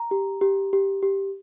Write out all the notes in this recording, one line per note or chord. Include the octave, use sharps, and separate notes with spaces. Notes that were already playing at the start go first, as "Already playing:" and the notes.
Already playing: A#5
G4
G4
G4
G4